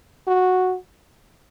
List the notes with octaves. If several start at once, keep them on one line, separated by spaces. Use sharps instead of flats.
F#4